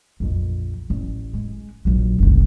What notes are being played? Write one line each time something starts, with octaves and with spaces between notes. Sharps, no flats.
A#1 F2
A1
G#3
A#1 F#3
F#1 C2